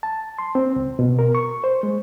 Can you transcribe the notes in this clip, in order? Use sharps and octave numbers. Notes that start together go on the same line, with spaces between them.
A5
C6
C4
C#2
B2
A#4
C#6
C5
G#3